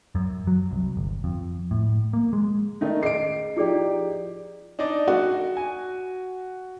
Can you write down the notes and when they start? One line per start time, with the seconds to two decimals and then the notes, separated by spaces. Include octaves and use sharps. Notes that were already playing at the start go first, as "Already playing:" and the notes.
0.15 F#2
0.47 F#3
0.71 C2
0.97 G1
1.24 F2
1.71 A2
2.13 A#3
2.33 G#3
2.81 D#3 A3 C#4 D#4 D#5
3.03 G#4 D#5 C7 D7
3.56 F3 D#4 E4 G4 G#4 D5
4.79 D4 D#4 D5
5.08 F#4
5.57 G#5